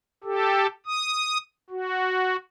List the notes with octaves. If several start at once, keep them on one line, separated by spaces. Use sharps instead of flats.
G4 A4
D#6
F#4